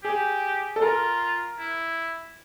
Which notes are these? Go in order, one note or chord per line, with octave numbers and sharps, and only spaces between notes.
G4 G#4
A4
F4 A#4
E4